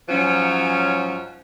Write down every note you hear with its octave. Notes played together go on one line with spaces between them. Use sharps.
G#2 F3 F#3 C#4